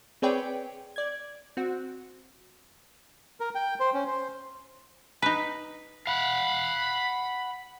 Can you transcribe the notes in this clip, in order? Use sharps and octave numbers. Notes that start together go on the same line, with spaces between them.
C4 G#4 B4 C#5 D5 G5
D5 G#6
C4 F#4
A#4
G5
C5
C#4
C5
D#4 B4
F5 F#5 B5